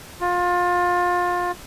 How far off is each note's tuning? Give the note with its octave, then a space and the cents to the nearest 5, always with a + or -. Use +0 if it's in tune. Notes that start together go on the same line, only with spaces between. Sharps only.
F4 +25